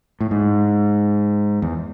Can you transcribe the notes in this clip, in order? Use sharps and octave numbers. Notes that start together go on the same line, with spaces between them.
A2
G#2
E2